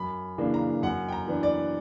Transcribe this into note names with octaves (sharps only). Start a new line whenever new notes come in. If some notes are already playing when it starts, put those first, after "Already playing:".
Already playing: F#2 B5
C#3 E3 A#3 D4
A#5
F#2 F#5
G5
A#5
E3 B3 D4
D5